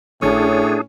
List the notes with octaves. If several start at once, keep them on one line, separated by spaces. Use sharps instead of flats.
G#1 A2 C#4 D4 G#4